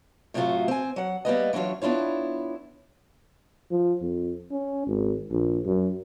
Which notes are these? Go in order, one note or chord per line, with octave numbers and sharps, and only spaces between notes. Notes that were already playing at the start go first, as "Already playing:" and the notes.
A2 C3 F#3 A3 F4 F#4
C4 G#5
F#3 F#5
G3 A#3 B3 D#5
E3 F#3 D4 F4 C#5
B3 D4 E4 F4 C#5
F3
F2
C#4
G#1
A#1
F#2